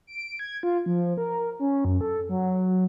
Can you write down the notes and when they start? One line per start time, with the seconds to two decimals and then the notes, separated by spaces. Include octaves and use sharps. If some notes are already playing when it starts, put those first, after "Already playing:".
0.07 D7
0.39 G#6
0.63 F4
0.86 F3
1.18 A#4
1.60 C#4
1.85 F#2
2.01 A4
2.29 F#3